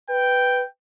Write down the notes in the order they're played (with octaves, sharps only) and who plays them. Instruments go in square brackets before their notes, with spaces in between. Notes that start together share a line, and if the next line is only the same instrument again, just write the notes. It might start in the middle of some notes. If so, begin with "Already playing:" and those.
[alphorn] B4 [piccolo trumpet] G5